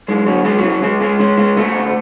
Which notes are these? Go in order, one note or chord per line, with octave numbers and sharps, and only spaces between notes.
F#2 G#3
D3 F#3
C#3 G#3
F#3
C#3
F#3
C#3 G#3
C#3 G#3
C#3 G#3
C#3 G#3
C#3 A3
D2